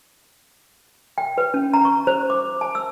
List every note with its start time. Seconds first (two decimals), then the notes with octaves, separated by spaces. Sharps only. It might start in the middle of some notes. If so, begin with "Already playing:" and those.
1.18 G5
1.38 B4
1.54 C#4
1.74 A#5
1.85 C#6
2.07 C5
2.30 D6
2.61 A5
2.75 E6